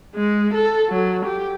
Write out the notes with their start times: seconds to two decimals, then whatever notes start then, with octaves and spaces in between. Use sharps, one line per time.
0.15 G#3
0.54 A4
0.90 F#3
1.26 G4